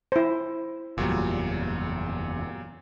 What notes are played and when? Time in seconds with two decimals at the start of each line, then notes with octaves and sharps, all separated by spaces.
0.12 E4 C5
0.98 F#1 E2 A#2 F#3 G3